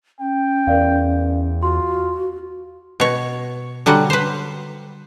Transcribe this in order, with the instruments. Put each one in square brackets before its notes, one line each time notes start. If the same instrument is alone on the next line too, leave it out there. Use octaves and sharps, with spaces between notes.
[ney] C#4 [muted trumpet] G5
[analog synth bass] E2 [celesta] A#4 D5 F5
[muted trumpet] F4 [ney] F#4 [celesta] C6
[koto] B2 C#5
D3 F#3 G3 F#5
B4 C5